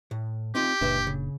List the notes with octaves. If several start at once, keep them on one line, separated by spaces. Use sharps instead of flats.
A2
C4 D#4 F4 G4
F#1 C#2 A#2 D4 B4 E5
C#3